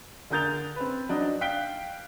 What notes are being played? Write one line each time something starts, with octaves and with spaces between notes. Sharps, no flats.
D3 G#4 A#4 G6 A6 F7
C4 B4
F#3 D4 D#4
F5 G5 F#6 B6 D7 G7